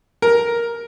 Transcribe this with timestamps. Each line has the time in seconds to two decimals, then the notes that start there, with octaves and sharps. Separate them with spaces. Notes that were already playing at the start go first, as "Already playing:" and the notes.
0.22 A#4